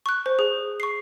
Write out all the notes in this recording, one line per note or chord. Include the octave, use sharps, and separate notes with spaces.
C#6 F#6
C5
G#4
C#6 C7